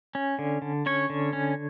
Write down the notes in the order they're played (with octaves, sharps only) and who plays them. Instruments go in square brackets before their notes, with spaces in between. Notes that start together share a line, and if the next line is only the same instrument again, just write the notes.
[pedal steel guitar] C#4
D3
D3
C#4 C#5
D3
C#4